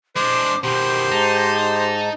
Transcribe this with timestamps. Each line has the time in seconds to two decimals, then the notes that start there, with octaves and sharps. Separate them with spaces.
0.16 G#3 D4 C5 D6
0.64 B2 D#3 G4 C5
1.11 G#2 D#4 A5